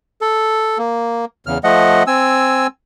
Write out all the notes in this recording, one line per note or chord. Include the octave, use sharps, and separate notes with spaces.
A4
A#3
E2 C#3 F6
F3 A3 D#5 F#5
C4 G#5 E6